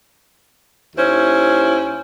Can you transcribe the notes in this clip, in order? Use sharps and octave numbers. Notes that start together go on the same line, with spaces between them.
D#2 C#4 E4 C5